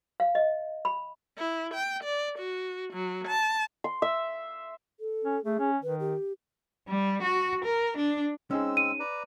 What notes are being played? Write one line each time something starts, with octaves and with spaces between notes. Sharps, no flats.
F5
D#5
B5
E4
G5
D5
F#4
F#3
A5
C6
E5
A4
C#4
A3 G#4
C#4
D#3 B4
G4
G3
F#4
A#4
D4
G#3 C4 C#4 D#4 G#4 E6
D#7
B4 D5 A#5